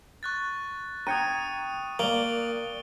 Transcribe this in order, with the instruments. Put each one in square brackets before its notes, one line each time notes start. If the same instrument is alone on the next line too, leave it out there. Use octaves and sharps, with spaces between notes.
[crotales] C#6 F#6 A6
[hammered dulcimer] G5 [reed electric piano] A#5 G#6 [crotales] D#6 C#7 D#7
[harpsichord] A#3 [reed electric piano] A#4 D5 [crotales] D7 G7